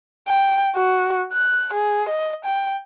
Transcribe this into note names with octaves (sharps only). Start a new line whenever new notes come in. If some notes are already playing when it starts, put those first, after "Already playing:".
G5
F#4
F#6
G#4
D#5
G5